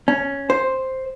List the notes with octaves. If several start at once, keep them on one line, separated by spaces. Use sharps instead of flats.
C#4
C5